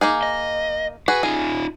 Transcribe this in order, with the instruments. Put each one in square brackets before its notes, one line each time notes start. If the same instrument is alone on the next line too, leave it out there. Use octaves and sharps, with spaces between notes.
[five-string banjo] A#3 D#4 G#4
[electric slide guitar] D#5
[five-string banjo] F#4 G#4 [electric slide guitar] B4
[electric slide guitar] D#4 F4 [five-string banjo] G#4